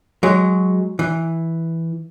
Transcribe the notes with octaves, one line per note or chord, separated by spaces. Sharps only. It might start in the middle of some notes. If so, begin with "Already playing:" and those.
F#3 G#3
E3